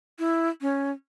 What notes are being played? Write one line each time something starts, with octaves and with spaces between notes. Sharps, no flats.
E4
C#4